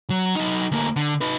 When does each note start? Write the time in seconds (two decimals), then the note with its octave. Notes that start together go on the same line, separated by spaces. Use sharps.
0.10 F#3
0.35 F#3 D#4
0.72 D2 A#3
0.96 D3
1.21 D#4 B4